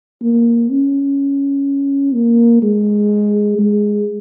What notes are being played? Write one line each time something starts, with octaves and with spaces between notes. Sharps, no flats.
A#3
C#4
A#3
G#3
G#3